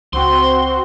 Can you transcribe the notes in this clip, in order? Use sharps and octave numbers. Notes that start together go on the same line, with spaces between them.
C#2 C4 F#4 C6